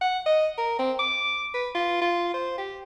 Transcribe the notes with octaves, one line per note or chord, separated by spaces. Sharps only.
F#5
D#5
A#4
C4
D6
B4
F4
F4
C5
G4